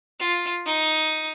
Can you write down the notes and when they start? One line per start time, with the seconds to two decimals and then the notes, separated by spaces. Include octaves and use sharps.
0.20 F4
0.66 D#4